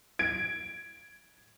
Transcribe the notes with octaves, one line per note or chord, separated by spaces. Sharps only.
G#6 D7